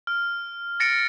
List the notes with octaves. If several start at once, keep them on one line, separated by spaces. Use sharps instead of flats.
F6
A6 A#6 C#7 D7